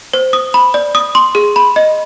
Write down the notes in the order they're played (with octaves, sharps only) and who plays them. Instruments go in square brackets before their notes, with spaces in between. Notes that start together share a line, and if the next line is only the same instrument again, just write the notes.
[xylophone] C5
D#6
B5
D5
D#6
C6
G#4
B5
D#5